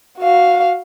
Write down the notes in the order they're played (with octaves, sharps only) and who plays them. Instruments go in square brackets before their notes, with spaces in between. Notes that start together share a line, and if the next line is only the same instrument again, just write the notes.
[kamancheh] F#4 F5